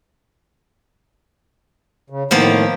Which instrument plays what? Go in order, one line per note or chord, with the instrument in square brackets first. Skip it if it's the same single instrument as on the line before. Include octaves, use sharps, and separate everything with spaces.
[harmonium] C#3
[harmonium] A2 D#3 [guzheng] F3 A#3 B3